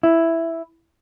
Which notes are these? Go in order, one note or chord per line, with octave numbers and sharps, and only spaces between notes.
E4